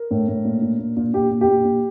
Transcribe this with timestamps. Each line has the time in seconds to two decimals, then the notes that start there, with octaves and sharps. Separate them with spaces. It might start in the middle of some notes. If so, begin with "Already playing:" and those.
Already playing: A#4
0.11 A2
0.28 A2
0.45 A#2
0.62 A#2
0.79 A#2
0.97 A#2
1.13 A#2 G4
1.31 A#2
1.41 G4
1.48 A#2
1.65 A#2